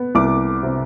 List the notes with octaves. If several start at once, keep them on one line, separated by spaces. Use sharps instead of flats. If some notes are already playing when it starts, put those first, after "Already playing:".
Already playing: B3
C2 D6
C3